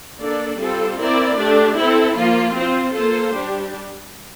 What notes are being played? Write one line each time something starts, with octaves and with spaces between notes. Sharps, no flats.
A#3 D4 A4 D5
G3 C4 F4 A4
C4 E4 A#4 D5
A3 D4 G4
C4 E4 A4
F3 A#3 F4
C4 F4 C5
A#3 F4 A4 C5
G3 D4 G4